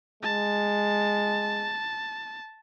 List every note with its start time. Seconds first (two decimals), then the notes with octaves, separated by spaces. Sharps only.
0.23 G#3 A5